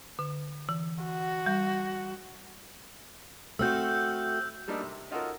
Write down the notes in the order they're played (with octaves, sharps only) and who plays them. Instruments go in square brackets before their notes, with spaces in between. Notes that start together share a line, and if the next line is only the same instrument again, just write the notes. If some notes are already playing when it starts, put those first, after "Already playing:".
[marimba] D3
E3
[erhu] F#4
[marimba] G3
[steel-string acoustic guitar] A3 C4 F#4 [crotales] E6 F6 G6
[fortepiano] G3 A3 A#3 D4 D#4 A4
C3
C#4 D#4 F4 F#4 A4 A#4